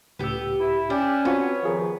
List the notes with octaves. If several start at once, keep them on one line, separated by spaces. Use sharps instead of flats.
C#2 A2 B3 G4 E6
E4
C#4 D4 G4
B3 C4 F4 F#4 C#5
C3 D#3 F3 F4 G#4 A#4